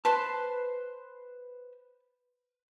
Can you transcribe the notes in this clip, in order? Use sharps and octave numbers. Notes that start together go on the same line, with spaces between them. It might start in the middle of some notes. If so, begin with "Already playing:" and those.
B4 C5 A5 C6